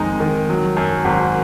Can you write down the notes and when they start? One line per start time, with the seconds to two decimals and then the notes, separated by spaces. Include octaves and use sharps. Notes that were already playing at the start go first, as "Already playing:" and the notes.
Already playing: F2 D#3 G#3 D#4
0.20 D#3
0.50 F#3
0.77 F#2
1.05 G#1